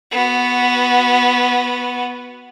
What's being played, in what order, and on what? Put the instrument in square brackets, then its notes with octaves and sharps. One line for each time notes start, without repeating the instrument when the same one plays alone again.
[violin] B3 F#4